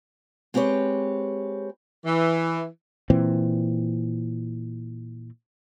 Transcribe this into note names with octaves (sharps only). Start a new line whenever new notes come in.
G#3 C4 G4 B4 C#5
E3
A#2 E3 C4